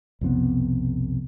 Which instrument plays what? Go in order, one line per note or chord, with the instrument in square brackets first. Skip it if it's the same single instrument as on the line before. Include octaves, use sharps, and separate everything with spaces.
[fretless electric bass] B1 F2 C3 B3